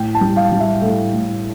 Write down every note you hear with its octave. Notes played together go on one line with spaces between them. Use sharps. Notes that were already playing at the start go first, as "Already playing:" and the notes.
Already playing: A2 G5
A5
G3
F5
G3
E5
A2 A4
A2